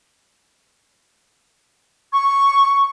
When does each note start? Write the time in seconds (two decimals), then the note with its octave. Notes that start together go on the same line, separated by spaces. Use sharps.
2.13 C#6